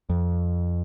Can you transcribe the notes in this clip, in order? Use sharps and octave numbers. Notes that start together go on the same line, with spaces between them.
F2